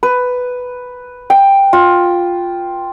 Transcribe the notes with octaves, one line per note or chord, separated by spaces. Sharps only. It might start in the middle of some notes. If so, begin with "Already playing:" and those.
B4
G5
F4